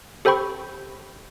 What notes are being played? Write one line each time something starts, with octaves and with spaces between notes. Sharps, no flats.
G4 A4 C5 G5 B5 C#6